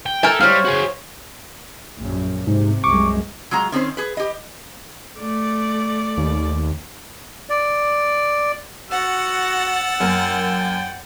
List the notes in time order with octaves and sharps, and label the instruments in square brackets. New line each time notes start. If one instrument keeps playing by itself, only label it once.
[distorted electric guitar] G5
[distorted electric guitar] A4 [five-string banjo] A#4 G5 G#5 [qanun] E5
[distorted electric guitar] G3 [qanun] C5 C#5 [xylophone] F5 F6
[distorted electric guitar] F#4 G#4
[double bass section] A#1 F#2
[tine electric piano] G#2 [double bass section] C3
[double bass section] C2 F#2 G#3 [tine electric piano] C#6 D6
[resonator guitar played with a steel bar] F#3 G#3 F4 A#5
D#3 C4 C#4 C5
G#4 B4
G4 D#5
[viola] A3 D5
[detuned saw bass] D#2
[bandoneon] D5
[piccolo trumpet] F#4 [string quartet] F#5 A6 [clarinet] E6
[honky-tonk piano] F#2 A#3 A#4 [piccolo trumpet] G5